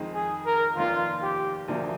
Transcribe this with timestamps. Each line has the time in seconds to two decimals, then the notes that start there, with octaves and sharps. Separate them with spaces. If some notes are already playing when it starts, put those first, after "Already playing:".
Already playing: F2 D#3 G#3 C4 D#4
0.14 G#4
0.46 A#4
0.76 F1 D#2 D#3 A#3 D4 F4
1.23 G4
1.68 D2 C3 F3 A#3 D4